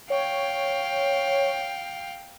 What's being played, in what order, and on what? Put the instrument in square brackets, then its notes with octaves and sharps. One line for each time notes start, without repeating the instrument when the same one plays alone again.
[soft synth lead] C#5 [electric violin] F5 G5